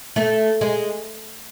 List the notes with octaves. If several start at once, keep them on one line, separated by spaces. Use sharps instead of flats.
A3
G#3